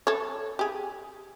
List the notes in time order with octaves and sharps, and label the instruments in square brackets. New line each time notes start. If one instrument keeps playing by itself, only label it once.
[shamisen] A4 C#5
G4 G#4